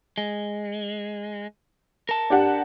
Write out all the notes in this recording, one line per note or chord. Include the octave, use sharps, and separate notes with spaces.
G#3
A#4 A5
D4 G4 F#5